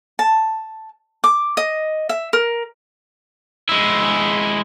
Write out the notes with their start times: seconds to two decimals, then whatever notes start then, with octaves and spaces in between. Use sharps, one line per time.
0.19 A5
1.24 D6
1.57 D#5
2.09 E5
2.33 A#4
3.69 G#3 E4